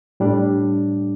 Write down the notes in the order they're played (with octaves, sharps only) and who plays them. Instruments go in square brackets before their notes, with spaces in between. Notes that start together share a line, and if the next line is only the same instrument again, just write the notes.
[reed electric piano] A2 G3 D4